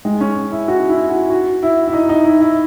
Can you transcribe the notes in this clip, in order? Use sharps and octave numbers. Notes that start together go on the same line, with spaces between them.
G#3
C#4
E4
F#4
E4
F#4
F#4
E4
E4
D#4
D#4
E4
E4